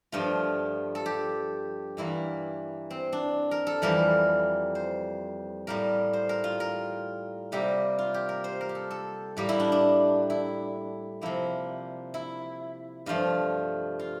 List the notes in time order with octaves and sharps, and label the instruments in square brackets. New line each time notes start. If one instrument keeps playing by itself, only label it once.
[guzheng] G2 F3 A3 F4
A4
G4
G2 E3 A#3 E4
C4
D4
A#4
A4
F2 E3 G3 A#3 A#4
C5
A2 G3 A#3 A#4
C5
A#4
F4
A#4
C3 G3 A#3 G4
F4
G4
A#4
C5
A#4
G4
A4
A4
A2 G3 A#3 G4
E4
D4
D4
E4
C3 F3 A#3 E4
E4
G2 F3 A3 F4
F4